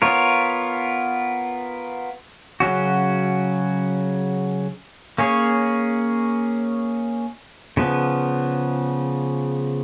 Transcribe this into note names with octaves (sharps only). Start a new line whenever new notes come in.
B3 F4 A#4 C#5
C#3 F#3 C#4 F#4
A#3 C#4 G#4 C#5
C#3 F3 B3